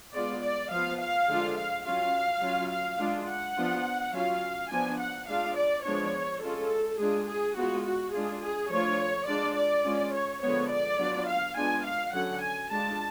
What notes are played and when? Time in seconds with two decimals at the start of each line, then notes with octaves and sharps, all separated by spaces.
0.14 G#3 B3 F4 D5
0.43 D5
0.71 F3 B3 F4 F5
0.99 F5
1.28 D3 F3 G#3 D4 F4
1.57 F5
1.85 F#3 C#4 F4 F5
2.42 F#3 C#4 F4
2.71 F5
3.00 G#3 D4 F4
3.28 F#5
3.56 F3 B3 D4 F4
4.13 F#3 C#4 F4 F5
4.70 F3 B3 D4 G#5
4.99 F#5
5.28 G#3 D4 F4 F5
5.57 D5
5.85 F3 G#3 B3 D4 C#5
6.42 G#3 C#4 F4 A4
6.99 G#3 D4 F4 G#4
7.28 G#4
7.56 G#3 B3 F4 F#4
7.85 F#4
8.14 G#3 D4 F4 G#4
8.42 G#4
8.71 F3 A3 D4 F4 C#5
9.27 G#3 D4 F4 D5
9.56 D5
9.85 G#3 C#4 F4
10.14 C#5
10.42 D3 F3 G#3 B3 C#5
10.70 D5
10.99 F#3 B3 D4 F4
11.28 F5
11.56 G#3 B3 D4 F4 G#5
11.85 F5
12.13 D3 F#3 C#4 F#5
12.42 G#5
12.70 G#3 D4 F4 A5